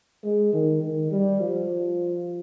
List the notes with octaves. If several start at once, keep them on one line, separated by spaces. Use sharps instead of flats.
G#3
D#3
D#3
G3
F3